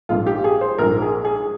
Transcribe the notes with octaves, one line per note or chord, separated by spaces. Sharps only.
A#1 G#2 F3 F4
G4
G#4
C5
A#1 G#2 F3 A#4
G#4
G#4